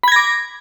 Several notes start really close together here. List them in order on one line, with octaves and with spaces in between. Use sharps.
B5 G#6 A#6 D6